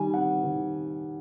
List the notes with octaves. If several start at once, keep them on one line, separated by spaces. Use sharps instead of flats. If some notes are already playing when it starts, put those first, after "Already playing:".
Already playing: D#3 G3 G#5
C4 F#5
D#3